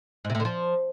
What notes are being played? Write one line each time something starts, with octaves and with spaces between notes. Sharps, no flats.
G#2
C3
A2
D3
F3